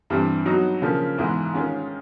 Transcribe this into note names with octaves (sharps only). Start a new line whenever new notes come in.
G2 E3 G3 C4
F#3 B3 D#4 F#4
C#3 F3 A#3
G#2 E3 G#3 B3
D#3 G#3 C#4 F4